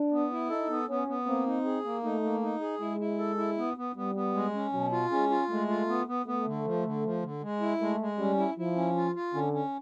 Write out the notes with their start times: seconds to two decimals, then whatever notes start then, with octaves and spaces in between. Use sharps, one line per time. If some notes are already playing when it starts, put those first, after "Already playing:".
Already playing: D4
0.12 B3
0.31 E4
0.50 D#4 A4
0.68 B3
0.88 B3 C#4
1.08 B3
1.26 A#3 C4
1.46 D#4
1.65 G#4
1.84 A#3
2.03 A3 D#4
2.23 A#3
2.43 D#4
2.61 G#4
2.80 G#3 E4
3.00 E4
3.18 A4
3.38 E4
3.57 B3
3.77 B3
3.95 G3 B3
4.15 B3
4.34 G#3
4.54 C#4
4.73 B2 F#3
4.92 F4
5.11 G#3 C#4
5.30 F4
5.49 G#3 A3
5.69 F4
5.88 B3
6.07 B3
6.26 A3 B3
6.46 D3
6.64 F3
6.84 D3
7.04 F3
7.23 D3
7.42 G#3
7.61 E4
7.80 G#3 A3
8.00 G#3
8.18 G3 C#4
8.38 E4
8.58 F3 E4
8.76 C#4
8.96 F4
9.15 F4
9.34 D3 C#4
9.53 C#4